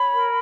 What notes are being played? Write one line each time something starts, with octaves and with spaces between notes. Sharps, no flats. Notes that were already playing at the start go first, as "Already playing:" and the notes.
Already playing: C#5 B5
A#4